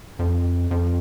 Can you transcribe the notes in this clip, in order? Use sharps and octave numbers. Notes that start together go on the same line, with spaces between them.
F2
F2